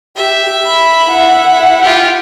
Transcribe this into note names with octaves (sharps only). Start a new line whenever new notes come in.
G4 E5
B5
E4 F#5
F4 G4